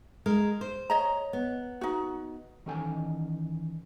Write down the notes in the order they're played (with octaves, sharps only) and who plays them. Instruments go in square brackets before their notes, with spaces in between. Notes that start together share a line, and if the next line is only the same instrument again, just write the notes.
[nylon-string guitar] G#3 A#4
C5
[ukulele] C#5 D#5 A#5
[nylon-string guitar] B3
[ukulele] D#4 F#4
[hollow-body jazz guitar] D#3 E3 C#4 A4 G5 G#5